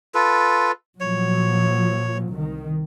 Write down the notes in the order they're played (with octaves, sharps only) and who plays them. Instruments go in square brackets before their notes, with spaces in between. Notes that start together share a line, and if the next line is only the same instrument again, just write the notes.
[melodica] F4 A4 B4
[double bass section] A#2 F3 F#3 [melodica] C#5
[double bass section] C2 D#3